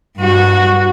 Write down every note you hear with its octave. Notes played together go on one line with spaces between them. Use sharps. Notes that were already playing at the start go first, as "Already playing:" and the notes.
G2 F#4